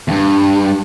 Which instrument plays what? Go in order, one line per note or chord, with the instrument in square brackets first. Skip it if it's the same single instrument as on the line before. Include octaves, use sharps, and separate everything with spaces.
[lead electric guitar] E2 G2